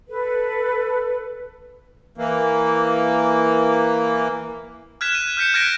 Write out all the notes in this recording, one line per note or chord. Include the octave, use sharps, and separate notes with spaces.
A4 B4
E3 A#3
F6 F#6 G#6 B6 E7
D#7
F6 G6 B6 C#7 D#7
F6 F#6 G#6 A#6 B6 D7